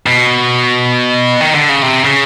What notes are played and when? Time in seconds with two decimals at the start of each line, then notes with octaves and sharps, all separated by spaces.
0.06 B2
1.41 D#3
1.55 D3
1.69 C#3
1.82 C3
2.04 C#3